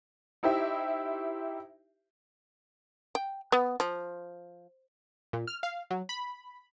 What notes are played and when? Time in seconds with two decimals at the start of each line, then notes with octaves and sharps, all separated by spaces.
0.43 D#4 E4 G4 C5 E5
3.15 G5
3.52 B3
3.80 F3
5.33 A#2
5.47 F6
5.63 F5
5.90 F#3
6.09 B5